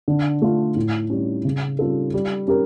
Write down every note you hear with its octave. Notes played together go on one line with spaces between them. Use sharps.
D3
A3 D4 F4
A2
G3 C#4
C#3
G3 C#4 F4 A4
G3
C#4 G4 A#4